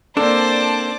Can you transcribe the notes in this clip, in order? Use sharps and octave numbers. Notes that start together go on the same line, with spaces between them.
A#3 C4 D4 A4 C5 D5 A5 D6